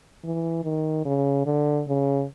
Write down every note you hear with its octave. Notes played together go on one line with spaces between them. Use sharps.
E3
D#3
C#3
D3
C#3